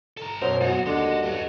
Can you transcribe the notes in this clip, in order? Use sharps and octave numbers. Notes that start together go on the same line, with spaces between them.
A4 A#5
F#2 B2 F#3 A#4 C5
G#3 B3 F#4
D#2 D3 D4 D#5 C6
G2 A4 D#5